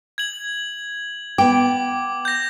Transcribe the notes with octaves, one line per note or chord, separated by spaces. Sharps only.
G#6 F#7
B3 G5 D6
G6 A#6